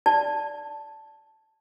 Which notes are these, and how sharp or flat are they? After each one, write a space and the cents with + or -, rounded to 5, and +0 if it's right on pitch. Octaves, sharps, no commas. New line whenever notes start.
D5 -10 A5 +0